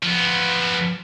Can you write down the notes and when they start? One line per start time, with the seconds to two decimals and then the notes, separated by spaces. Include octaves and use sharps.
0.03 F3 B3